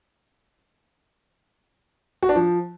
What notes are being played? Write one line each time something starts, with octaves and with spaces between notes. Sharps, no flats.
F#4
D4
F3